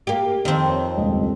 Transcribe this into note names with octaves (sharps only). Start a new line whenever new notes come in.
A#3 G4
F2 D#3 C4
C#5
D#1 C#2 D#5